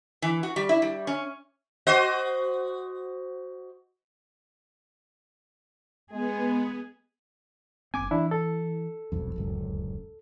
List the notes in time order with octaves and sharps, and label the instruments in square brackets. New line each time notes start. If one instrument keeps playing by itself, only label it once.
[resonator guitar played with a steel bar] E3
F#4
G3
E4
G3
C#4
[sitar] F#4 C5 D#5
[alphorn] G#3 [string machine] B3 [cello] G#4
[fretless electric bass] F#1 C4 [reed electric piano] G#5 D6
[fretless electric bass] E3 [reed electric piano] D4 E4
[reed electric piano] A4
[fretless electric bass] E1 B1 F2
D1 C#2 F#2